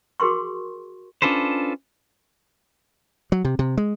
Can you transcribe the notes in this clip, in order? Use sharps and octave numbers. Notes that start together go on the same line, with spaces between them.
F#4 G#4 A#4 C6 C#6
C#4 D4 F4 A4 B4 C5
F#3
C3
C3
G#3